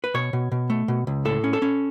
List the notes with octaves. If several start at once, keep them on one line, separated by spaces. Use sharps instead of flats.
B4
B2 C#5
B2
B2
A3
B2
C#2
A2 A4
C#4
A4
C#4